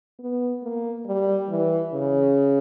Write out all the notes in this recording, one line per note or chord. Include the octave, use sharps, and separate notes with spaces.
B3
A#3
G3
E3
C#3